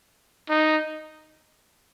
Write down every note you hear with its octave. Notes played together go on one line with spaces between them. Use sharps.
D#4